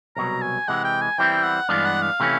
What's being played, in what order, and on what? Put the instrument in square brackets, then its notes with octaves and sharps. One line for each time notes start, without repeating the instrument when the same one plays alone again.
[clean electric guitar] C2 B2 F#3 [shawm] A#5
[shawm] G#5
[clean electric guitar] C3 E3 G#3 [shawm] F#5
[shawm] G5
G#5
[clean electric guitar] E3 G3 C4 E4 [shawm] G5
[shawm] F#5
[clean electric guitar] G2 E3 G#3 B3 D4 [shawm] F5
[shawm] F#5
F5
[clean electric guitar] C3 E3 A3 C#4